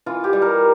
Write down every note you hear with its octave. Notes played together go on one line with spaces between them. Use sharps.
E3 F4
G4
G3
A#4